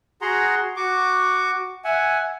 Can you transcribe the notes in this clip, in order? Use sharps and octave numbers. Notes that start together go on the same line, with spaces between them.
F#4 G#4 F#5 A#5 C6
F#4 C#6 D6
E5 F#5 G#5